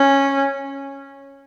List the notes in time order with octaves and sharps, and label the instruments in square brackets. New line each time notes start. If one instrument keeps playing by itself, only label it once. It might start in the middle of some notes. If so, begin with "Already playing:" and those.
Already playing: [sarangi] C#4